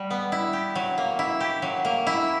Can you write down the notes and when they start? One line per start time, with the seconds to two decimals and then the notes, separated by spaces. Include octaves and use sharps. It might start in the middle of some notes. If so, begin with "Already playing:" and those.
Already playing: G3 F#4
0.10 B3
0.32 E4
0.53 G4
0.76 F#3
0.98 A#3
1.19 E4
1.40 G4
1.62 F#3
1.85 A#3
2.07 E4